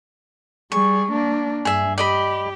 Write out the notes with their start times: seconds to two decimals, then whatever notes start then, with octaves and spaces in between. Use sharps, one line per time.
0.72 G3 G#4 C#6
1.12 A#3 D4
1.65 G2 G#4 E5
1.98 G4 D5 D#5 B5